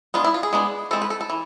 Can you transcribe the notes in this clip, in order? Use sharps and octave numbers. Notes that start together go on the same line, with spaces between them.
G#3 B3 D4 F4
E4
F4
G#4
G#3 B3 D4
E3 G#3 C4 A4
B4
A4
A4
E3